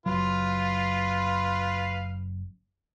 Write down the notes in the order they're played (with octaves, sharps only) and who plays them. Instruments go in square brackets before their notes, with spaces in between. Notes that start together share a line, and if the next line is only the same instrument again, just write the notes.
[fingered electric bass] F#1 F#3 [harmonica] F4 B4 F5